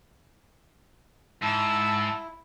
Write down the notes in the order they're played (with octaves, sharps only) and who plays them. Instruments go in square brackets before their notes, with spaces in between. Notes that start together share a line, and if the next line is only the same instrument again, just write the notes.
[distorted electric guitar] G#2 [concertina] E4 [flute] A5 [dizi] E6